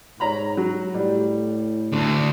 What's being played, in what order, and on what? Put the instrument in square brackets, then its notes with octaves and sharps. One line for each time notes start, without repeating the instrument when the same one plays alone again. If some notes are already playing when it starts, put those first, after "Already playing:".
[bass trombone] G#2 [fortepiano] C#5 A#5 B5
[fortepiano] F#3
[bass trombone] A2 [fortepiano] G3
[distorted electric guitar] D2 D3